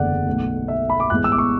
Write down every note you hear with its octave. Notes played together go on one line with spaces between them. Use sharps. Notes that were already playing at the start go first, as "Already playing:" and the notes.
Already playing: F#1 E2 D3 A3 D5 F#5
B1 B2 A3
E5
B5
D6
A1 A2 G#3 B3 F#6
E6
D6
C#6